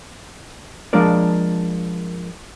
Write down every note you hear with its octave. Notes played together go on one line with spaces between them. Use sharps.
F3 G#3 A#3 D4 A#4 D5